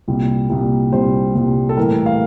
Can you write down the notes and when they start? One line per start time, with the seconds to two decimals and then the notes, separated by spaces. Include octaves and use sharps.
0.08 C2 A#2 G3
0.50 C2 A#2 G3
0.92 C2 A#2 G3 C5
1.35 C2 A#2 G3
1.69 A4
1.77 A2 E3 G3 A#4
1.91 A#4
2.06 F5